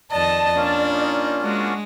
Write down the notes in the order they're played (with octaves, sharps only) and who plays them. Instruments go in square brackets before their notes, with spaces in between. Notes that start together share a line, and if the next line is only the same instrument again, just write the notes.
[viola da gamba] F2 D#3 D#5 [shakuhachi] D5 [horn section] A5
[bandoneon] A#3 C#4 F4 [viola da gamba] D4
[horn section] D#4
[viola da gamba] G#3 [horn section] D4 F#4